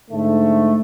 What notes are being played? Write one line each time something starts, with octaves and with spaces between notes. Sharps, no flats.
G#2 D3 A3